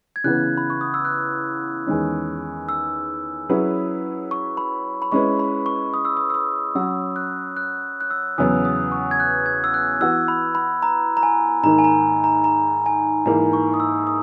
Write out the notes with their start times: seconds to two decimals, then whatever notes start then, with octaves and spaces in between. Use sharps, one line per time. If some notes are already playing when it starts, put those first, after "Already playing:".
0.16 G#6
0.24 C#3 E3 B3 F#6
0.58 B5
0.70 C#6
0.81 D#6
0.94 E6
1.05 F#6
1.87 E2 D#3 G#3 C#4
2.69 E6
3.49 F#3 C#4 E4 G#4 B4
4.31 C#6
4.57 B5
5.02 B5
5.12 G#3 C#4 E4 B4 C#6
5.39 B5
5.66 C#6
5.94 D#6
6.05 E6
6.17 D#6
6.30 E6
6.34 D#6
6.75 F#3 C#4 F#4 E6
7.16 F#6
7.56 F#6
8.01 F#6
8.11 E6
8.38 E2 C#3 F#3 B3 D#6
8.65 D#6
8.92 C#6
9.11 G#6
9.20 F#6
9.46 G#6
9.64 E6
9.74 F#6
10.01 E3 B3 F#4 E6
10.28 B5
10.55 B5
10.83 A#5
11.17 A#5
11.23 G#5
11.63 G#2 D#3 A#3 A#5
11.78 G#5
11.84 A#5
12.24 A#5
12.44 A#5
12.86 G#5
13.25 G#2 E3 A#3 A#5
13.53 C#6
13.74 D#6
13.80 E6
14.07 D#6